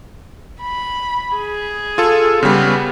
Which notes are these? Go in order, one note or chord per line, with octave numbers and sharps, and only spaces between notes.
B5
G#4
F4 A4
C#3 G3 B3